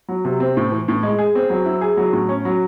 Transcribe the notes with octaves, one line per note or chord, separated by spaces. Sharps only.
F#3
C3
C4
A2
E3
A2
G#3
G#4
C4
F#3
E4
G#4
F#3
A2
C#4
F#3